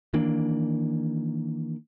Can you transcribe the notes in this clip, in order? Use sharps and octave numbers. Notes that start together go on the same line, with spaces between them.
D#3 E3 A#3 D4